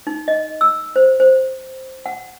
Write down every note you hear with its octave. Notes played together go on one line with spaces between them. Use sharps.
D#4
D#5
E6
C5
C5
F#5